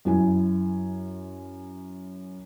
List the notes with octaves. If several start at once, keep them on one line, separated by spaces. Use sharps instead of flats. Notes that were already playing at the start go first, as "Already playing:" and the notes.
F#2 E4 G#5